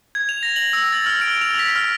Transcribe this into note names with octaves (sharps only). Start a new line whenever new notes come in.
G#6
F7
A#6
F#7
E6
A6
F6
D7
F7
B6
F6